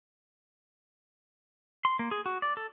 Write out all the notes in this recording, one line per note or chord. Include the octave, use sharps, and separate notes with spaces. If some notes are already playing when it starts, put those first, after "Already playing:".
C6
A#3
G#4
F#4
D5
A4